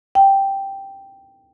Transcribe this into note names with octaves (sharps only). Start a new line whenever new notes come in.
G5